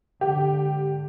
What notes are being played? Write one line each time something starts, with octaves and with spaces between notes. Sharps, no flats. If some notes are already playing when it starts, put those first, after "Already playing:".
G#2 D3 G4